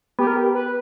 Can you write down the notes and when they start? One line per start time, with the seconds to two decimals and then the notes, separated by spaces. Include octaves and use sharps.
0.19 B3 G4
0.27 A#4
0.37 G4
0.55 B4